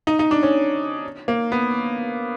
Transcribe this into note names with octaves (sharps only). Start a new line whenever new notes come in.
D#4
D#4
D4
C#4
A#3
B3